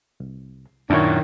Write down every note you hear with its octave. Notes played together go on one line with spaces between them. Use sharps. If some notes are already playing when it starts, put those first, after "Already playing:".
C2
F#2 A#2 D#3 D4 E4 C#5